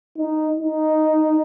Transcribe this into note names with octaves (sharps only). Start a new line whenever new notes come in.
D#4
D#4